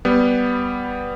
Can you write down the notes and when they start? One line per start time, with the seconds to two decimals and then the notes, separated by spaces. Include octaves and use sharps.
0.05 G3 B3